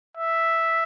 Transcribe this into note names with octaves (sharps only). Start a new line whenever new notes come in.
E5